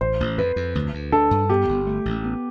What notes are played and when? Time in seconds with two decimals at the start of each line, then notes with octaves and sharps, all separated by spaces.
0.01 A1 C5
0.20 A1
0.38 F2 B4
0.56 F2
0.75 D2
0.93 D2
1.12 D4 A4
1.31 G2
1.49 B3 G4
1.68 G1
1.87 A3
2.05 A1
2.24 B3